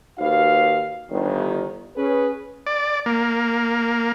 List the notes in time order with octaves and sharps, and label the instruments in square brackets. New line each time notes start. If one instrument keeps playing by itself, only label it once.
[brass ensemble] D#2 D#4 F#4 B4 F5
G1 D#3
C#4 G#4 B4
[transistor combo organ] D5
A#3